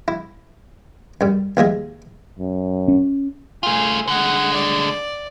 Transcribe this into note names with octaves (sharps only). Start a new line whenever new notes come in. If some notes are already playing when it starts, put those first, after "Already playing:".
E4
F#2 G3
D#2 F3 G#3 E5
F#2
C#4
A3 F4 G#4
D3 G#3 F#5
D5